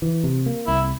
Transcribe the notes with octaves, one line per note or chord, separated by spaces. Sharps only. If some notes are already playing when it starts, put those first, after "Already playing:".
E3
C3
A#3
C2 E4